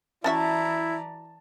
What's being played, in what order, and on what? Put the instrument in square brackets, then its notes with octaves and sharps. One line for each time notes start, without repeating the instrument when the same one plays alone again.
[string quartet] E3 D5 A#5 [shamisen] C#4 F#4 E5 [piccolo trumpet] E4 [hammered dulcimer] A5